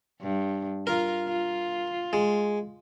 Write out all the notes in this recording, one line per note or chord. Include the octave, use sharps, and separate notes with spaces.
G2
F4 A#4
F4
G#3